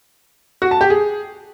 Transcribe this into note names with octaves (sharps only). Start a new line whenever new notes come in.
F#4
A5
G4
G#4